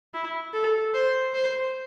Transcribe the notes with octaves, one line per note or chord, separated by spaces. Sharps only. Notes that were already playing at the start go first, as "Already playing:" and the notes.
E4
A4
C5
C5